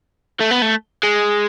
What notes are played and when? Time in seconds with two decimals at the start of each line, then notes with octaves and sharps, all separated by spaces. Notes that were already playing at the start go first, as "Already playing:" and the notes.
0.40 A3
0.51 B3
0.62 A3
1.03 G#3